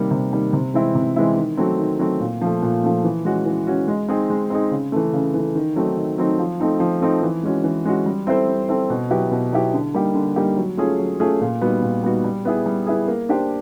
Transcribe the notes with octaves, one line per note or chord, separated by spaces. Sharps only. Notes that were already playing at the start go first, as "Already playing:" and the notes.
Already playing: C3 D#3 G3 A#3
C3
D#3 G3 A#3
C3
E3 G#3 C4 E4
C3
E3 G#3 C4 E4
D#3
F#3 A3 C4
D#3
F#3 A3 C4
A#2
F3 A3
A#2
F3 A3
E3
G#3 C#4 F#4
E3
G#3 C#4 F#4
G#3
C4 D#4 G#4
G#3
C4 D#4 G#4
C#3
E3 A3
C#3
E3 A3
D#3
F#3 A3 C4 D#4
D#3
F#3 A3 C4 D#4
F3
A3 C4 D#4
F3
A3 C4 D#4
E3
G#3 C#4 F#4
E3
G#3 C#4 F#4
G3
C4 E4 A4 C5
G3
C4 E4 A4 C5
B2
F#3 B3 E4 G4
B2
F#3 B3 E4 G4
D3
G3 A#3 D#4 G4
D3
G3 A#3 D#4 G4
F#3
A3 C#4 F4 G#4
F#3
A3 C#4 F4 G#4
A#2
G3 B3 D#4 F#4
A#2
G3 B3 D#4 F#4
G3
B3 E4 G#4
G3
B3 E4 G#4
A#3
D4 G4 C5